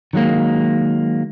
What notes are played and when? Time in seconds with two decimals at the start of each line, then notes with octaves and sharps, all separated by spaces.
0.13 D#3 F#3 G#3 A#3